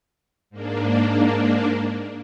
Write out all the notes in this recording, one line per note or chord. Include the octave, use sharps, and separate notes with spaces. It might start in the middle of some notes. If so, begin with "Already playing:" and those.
G#2 A#3 D4